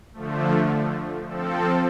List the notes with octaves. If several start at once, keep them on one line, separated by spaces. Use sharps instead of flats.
D3 F3 A3
F3 C4 A4